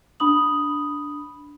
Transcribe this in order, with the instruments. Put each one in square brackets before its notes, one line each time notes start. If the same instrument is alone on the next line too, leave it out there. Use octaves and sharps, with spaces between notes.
[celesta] D4 B5 D#6 F#7